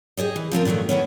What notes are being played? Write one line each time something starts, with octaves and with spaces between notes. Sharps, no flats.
G4 G#4 D5 D#5
E3
F3 C4 F4 A#4
A#2 D3 D#3 F#3 A3
D#3 E3 B3 C#4